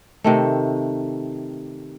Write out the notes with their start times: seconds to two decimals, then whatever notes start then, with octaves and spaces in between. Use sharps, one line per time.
0.24 C3 D#3 A3